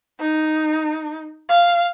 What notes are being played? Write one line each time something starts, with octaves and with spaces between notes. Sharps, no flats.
D#4
F5